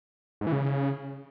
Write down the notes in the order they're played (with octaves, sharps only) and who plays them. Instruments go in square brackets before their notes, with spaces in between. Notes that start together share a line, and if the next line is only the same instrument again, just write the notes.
[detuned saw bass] G#2
E3
C#3